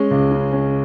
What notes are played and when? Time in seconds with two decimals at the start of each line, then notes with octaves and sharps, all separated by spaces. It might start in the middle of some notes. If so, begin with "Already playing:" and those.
Already playing: G#3 C#4
0.11 C#2
0.32 C#3
0.52 C#4